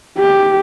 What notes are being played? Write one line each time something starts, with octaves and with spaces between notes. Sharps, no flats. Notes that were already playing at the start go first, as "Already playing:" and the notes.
G4